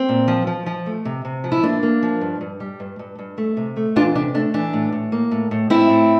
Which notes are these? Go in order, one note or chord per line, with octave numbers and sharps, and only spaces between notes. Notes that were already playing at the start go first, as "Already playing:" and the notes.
Already playing: C4
A#2
F3
F3
F3
A3
C3
C3
F3
E4
A#3 D4
A#3
F3
G2
G2
G3
G2
G2
G2
A3
C3
A3
E2 D4 F4
C3 D4
A3 D4
E3 D4
A2
A2
A#3
A2
A2
A2 C4 E4
A2